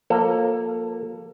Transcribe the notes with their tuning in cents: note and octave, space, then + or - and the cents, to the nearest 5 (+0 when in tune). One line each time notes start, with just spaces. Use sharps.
F3 +25 A#3 +0 A4 +20